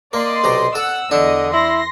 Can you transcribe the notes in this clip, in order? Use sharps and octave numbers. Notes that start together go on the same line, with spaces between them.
A#3 D5 D#5 C6
B1 C3 A#5
A4 F#5 E6
E2 D3 D4 D#5
E4 C6 A#6